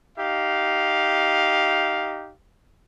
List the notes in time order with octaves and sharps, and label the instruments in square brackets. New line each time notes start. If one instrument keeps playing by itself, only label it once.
[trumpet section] D#4 G4 F5